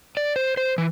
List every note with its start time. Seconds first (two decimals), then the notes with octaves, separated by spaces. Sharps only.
0.17 D5
0.36 C5
0.57 C5
0.78 E3